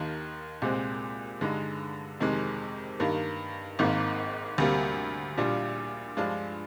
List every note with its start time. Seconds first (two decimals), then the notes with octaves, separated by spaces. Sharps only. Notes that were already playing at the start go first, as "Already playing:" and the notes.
Already playing: D#2 D#3 A#3
0.62 C2 A#2 G#3 C4
1.41 G2 D3 G#3 D#4
2.20 F2 C3 D#3 G#3
3.00 G2 D#3 A#3
3.79 G#1 G#2 D#3 A#3
4.58 D2 C3 G3 A#3
5.38 A#1 A#2 G3 D4 F4
6.17 G2 F3 G#3 D4 F4